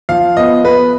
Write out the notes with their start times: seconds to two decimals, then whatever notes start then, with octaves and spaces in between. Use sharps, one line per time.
0.09 F3 F5
0.37 B3 D#5
0.64 B3 B4